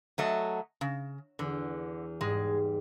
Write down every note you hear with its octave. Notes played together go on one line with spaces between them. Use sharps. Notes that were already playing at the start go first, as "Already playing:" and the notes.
F#3 A3 D#5
C#3
E2 D3
G#2 G3 G#3